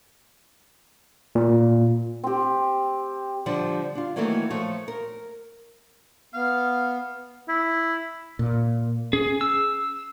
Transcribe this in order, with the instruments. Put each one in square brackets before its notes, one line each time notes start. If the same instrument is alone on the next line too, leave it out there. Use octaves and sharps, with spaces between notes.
[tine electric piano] A#2
[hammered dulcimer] C4 G4
[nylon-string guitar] D3 F3 G3
D4 F4
D#3 E3 F#3 A3 A#3 C#4
F3 A3 C#5
A#4
[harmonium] B3 [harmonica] F5
[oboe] E4
[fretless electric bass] A#2
[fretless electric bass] C#4 [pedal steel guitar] G#4
[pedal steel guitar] E6